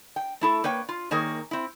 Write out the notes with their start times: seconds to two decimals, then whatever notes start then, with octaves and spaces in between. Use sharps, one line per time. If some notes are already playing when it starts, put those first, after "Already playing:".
0.16 G5
0.41 A3 E4 A4
0.64 A#3 B4 C#5 G5
0.89 F4
1.11 D#3 A#3 G#4 A#4 C#5
1.51 C4 E4